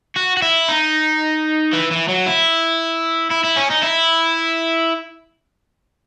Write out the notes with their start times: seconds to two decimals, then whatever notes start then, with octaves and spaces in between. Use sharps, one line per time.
0.17 F#4
0.37 F#4
0.42 E4
0.69 D#4
1.73 E3
1.92 E3
2.09 F#3
2.27 E4
3.31 E4
3.44 E4
3.57 C#4
3.71 D#4
3.83 E4